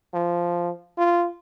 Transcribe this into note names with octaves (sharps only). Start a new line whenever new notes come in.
F3
F4